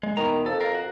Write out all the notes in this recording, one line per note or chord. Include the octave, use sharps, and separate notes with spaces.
G#3
E2 B2 D#3 A#5
F2 A4
A#4 F5
F#4